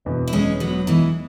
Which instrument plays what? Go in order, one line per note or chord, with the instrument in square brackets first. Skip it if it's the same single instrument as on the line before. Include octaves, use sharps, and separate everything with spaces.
[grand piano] E1 E2 B2
[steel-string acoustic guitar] E4
G#3 C#4
F#3 B3
E3 G#3